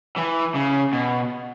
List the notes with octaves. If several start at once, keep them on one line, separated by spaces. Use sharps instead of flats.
E3
C#3
B2